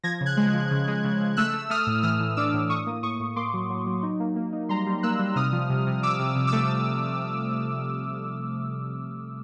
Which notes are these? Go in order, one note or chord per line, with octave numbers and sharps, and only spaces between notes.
F3 G#6 A#6
C#3
F#6 G#6
G#3
F3
C#3
G#3
C#3
C#3
A3 E6 F#6
A3
A3 D#6 F6
A2
E3 D#6 F6
E3
D4 D6 E6
A2
A2 C#6 D#6
A#3
A2 C#6 D#6
A2
A#3 C6 D6
F#3
F#3
F#3
D#4
A#3
A#3
D#4
G3 A#5 C6
G3
A#3 E6 F#6
G3
C3 D#6 F6
F3
C3
C3
C3 D6 E6
C3
C3
D6 E6
A3